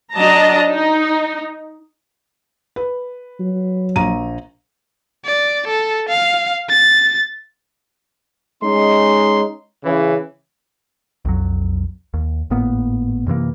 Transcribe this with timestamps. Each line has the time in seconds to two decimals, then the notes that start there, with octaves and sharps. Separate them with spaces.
0.14 F#3 D4 D#5 A5 A#5
0.71 D#4
2.76 B4
3.40 F#3
3.96 A#1 A#5 D#7
5.25 D5
5.67 A4
6.09 F5
6.69 A6
8.62 G#3 C#4 D#4 C6
9.84 C#3 E3
11.25 B1 F2 F#3
12.14 D#2
12.50 G#1 A2 A#3 B3
13.27 F#2 C3 E3 A#3